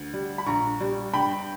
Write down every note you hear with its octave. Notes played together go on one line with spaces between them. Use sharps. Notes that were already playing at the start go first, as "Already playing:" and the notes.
Already playing: D2
G3
B5
A#1 A#5 C#6
G3
G2 G5 B5